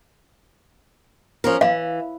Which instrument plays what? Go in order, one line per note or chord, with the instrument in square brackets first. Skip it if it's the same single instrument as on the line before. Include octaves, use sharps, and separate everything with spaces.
[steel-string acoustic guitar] F3 C#4 A#4
[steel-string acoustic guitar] E3 [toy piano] F5